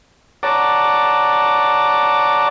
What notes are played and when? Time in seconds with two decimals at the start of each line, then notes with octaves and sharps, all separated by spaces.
0.43 C#5 D5 F#5 A5 A#5 D6